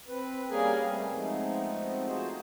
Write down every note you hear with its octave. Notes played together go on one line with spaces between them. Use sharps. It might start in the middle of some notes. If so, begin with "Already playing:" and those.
C4 B4
G3 A#3 C#4 G#4 A#4 G#5
C3 G3 A3 C4
F3 G#3 A3 B3 C4 D#4
D#4 F4 F#4 G#4 C5